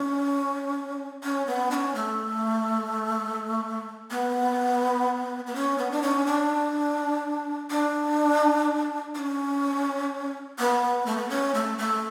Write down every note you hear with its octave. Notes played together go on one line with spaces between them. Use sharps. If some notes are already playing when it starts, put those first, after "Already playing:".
Already playing: C#4
C#4
B3
D4
C#4
A3
B3
B3
C#4
B3
D4
C#4
D4
D4
D4
C#4
B3
A3
B3
C#4
A3
A3